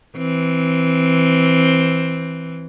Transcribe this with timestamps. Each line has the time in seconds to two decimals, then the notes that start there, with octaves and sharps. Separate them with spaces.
0.17 E3 C4